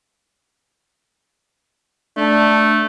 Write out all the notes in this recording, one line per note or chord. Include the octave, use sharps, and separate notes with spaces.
A3 D4